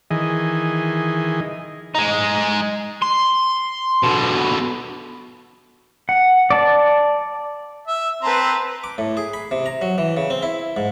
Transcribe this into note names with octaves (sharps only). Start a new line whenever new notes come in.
D#3 E3 G#4 D#5
G#3 D#4
C6
B2 D3
F#5
D5 A5
E5
C4 B4 A5 A#5 C6
D6
A2
G#4
B5
C3
A#5
F#3
E3
C#3
C4
E4
G#2